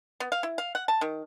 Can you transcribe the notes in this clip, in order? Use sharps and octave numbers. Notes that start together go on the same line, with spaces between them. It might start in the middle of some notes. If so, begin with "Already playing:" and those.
B3
F5
E4
F5
F#5
A5
D#3